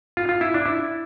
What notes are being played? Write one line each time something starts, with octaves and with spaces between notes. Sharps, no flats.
F4
F4
E4
D4
E4